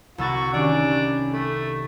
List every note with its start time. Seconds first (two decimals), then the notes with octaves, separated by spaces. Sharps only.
0.18 C2 F#4 E6 A6
0.54 D#3 C#4 D4 G4 D6
1.32 A3